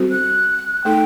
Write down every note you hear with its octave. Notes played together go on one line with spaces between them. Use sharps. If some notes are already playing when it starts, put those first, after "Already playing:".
Already playing: G3 C4 F#4 A4 C5
F#6
A3 D#4 A4 G5